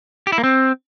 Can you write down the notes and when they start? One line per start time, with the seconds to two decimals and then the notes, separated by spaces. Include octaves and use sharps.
0.27 G4
0.32 E4
0.38 A#3
0.44 C4